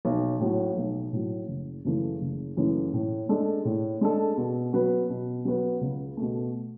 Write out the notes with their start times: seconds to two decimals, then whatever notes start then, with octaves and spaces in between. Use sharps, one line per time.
0.05 B1
0.40 A2 F#3
0.77 B1
1.13 A2 F#3
1.48 F#1
1.85 F#2 C#3 E3 A3
2.21 F#1
2.57 F#2 C#3 E3 A3
2.94 A2
3.29 G#3 D4 A4
3.65 A2
4.01 G#3 D4 A4
4.38 B2
4.73 F#3 B3 F#4 B4
5.10 B2
5.45 F#3 B3 F#4 B4
5.81 C#2
6.17 B2 A3